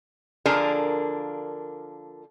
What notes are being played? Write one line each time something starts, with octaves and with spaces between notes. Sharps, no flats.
D3 F3 A#3 D4 G#4 A#4